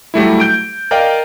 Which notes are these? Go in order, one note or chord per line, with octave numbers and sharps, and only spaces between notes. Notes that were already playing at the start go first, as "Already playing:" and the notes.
F#3 G3 A3 E4
G6 D7
A#4 D5 D#5 F5 G5